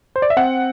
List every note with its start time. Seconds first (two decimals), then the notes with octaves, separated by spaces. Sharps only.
0.16 C5
0.22 D5
0.30 E5
0.37 C4 F#5